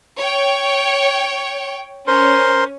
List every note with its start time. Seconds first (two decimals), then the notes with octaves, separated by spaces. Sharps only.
0.18 C#5 G5
2.07 C#4 A#4 C5 C6